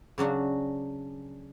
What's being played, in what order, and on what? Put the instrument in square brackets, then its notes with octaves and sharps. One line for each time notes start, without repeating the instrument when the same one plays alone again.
[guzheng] C#3 F#3 D4 F#4